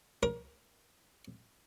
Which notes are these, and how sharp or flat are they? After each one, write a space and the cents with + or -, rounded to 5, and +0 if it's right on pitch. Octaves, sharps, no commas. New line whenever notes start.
A#4 +25